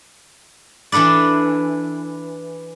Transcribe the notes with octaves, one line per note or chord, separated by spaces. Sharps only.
E3 D4 A4 B4 D5